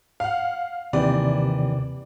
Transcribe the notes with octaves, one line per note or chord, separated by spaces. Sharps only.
F5 F#5
D#2 C3 E3 D5